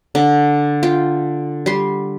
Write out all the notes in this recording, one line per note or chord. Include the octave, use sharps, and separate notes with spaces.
D3
F4 G5
G3 C6